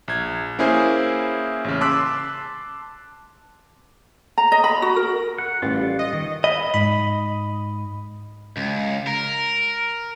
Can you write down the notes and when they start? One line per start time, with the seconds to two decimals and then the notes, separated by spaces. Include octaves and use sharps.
0.08 A#1 G#6
0.59 A#3 C#4 E4 G#4 C5
1.64 A1 C#3
1.81 A5 C6 D6 E6 F#6 B6
4.38 A#5
4.52 D#5
4.64 B5
4.82 F#4
4.96 A#4
5.38 F#5
5.62 A1 G3 F4
5.99 D#5
6.13 D#3
6.44 D#5 B5
6.74 G#2 B5
8.57 C#2
9.07 A#4